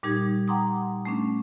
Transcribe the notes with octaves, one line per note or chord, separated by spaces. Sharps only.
A#2 G3 D#4 G4 G#6
F#5 G5 A#5 C6 D6 D#6
A3 C#4 D4